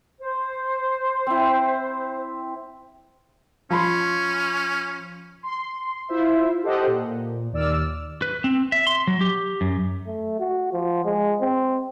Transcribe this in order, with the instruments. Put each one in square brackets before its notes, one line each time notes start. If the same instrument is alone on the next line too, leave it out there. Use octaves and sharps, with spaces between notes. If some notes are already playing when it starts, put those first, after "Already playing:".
[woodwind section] C5
[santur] C4 E4
[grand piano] F3 B5 C6 [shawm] C#4
[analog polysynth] C6
E4 F4 C5 E5
G4 A4 C5 D#5 F#5
A#2
D#2 D5 E6 F6
[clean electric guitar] B4
C4
E5
C6
F#3
G4
F#2
[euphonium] A3
F#4
F3
G#3
C4